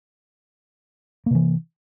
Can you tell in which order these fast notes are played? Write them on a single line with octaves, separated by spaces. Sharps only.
A#3 C3 E3